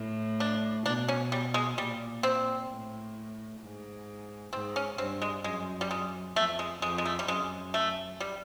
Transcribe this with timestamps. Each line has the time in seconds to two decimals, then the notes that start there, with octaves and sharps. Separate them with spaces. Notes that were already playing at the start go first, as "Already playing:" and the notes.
Already playing: A2
0.40 D4
0.86 B2 D4
1.08 C#4
1.32 G3
1.54 G#3
1.77 A#2 G3
2.23 C4
2.70 A2
3.61 G#2
4.52 G#2 C4
4.76 C#4
4.98 G2 C4
5.22 G#3
5.44 F#2 G#3
5.81 G3
5.91 G#3
6.36 F2 A3
6.59 G#3
6.82 F2 G#3
6.98 G#3
7.05 A3
7.19 G3
7.28 F#2 G#3
7.74 A3
8.20 G3